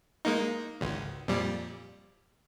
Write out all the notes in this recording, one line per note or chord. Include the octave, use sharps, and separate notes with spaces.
G#3 A#3 D#4
G#1 C#2
F2 A#2 G3